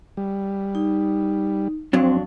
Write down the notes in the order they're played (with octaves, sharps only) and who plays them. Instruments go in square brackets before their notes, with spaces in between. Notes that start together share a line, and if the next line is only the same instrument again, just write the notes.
[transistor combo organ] G3
[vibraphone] D#4
[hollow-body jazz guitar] F2 F#3 D4 [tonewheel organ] C4